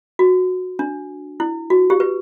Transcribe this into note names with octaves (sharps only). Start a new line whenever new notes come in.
F#4
D4
E4
F#4
G4
B4